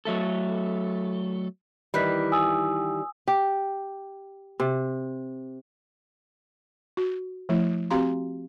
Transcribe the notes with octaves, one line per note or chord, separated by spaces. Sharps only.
F#3 A3 A4
D#3 E3 G3 B5 F#6 B6
G#5 D#6 E6
G4
C3
F#4
F3 A3 E4
C4 F#4 G4 F5 A#5 C6